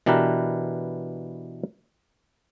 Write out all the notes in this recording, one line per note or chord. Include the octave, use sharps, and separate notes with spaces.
B2 E3 D4 G4 A#4 B4